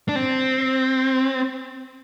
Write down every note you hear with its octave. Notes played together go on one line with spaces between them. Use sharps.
D4
C4